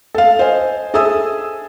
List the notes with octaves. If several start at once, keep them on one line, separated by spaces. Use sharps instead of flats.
A4 F5
C5 D#5 G#5
G#4 A4 E5 G#5 D#6 E6